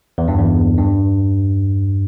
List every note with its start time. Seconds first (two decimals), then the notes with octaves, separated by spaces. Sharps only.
0.18 E2
0.28 G2
0.38 E2
0.78 G2